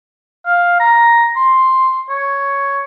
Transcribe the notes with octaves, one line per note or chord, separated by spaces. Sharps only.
F5
A#5
C6
C#5